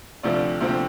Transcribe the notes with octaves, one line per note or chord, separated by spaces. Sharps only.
D2 C3 F3 C4 D5
D2 C3 F3 C4